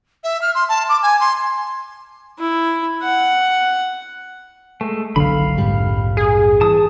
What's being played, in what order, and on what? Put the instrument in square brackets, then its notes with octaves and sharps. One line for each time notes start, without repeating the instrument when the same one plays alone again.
[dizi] E5
F6
C6
A5
D6
G#5
C6
[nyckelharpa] E4
F#5
[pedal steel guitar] G#3 A3
[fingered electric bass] F#1 B1 [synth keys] D3 [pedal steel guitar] F5 B5
[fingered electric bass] A#1 F2 G3 [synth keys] G#2
[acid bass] G#4
[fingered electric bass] E3 [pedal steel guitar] A5 D#6